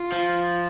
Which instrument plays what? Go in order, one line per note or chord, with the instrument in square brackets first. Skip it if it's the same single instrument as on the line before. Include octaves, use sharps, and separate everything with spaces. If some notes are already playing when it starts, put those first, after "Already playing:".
Already playing: [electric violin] F4
[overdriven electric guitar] F3